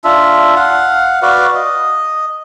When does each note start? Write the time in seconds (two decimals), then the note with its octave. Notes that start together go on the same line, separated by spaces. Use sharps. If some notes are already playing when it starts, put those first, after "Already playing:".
0.04 D4 F4 E5
0.56 F5 F#5
1.22 F#4 B4 D5 F5
1.54 D#5